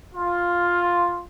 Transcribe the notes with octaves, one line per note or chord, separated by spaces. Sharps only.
F4